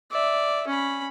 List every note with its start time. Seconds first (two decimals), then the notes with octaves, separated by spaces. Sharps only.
0.11 D5 E5
0.67 C#4 B5